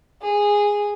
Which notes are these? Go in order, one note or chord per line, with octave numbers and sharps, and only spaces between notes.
G#4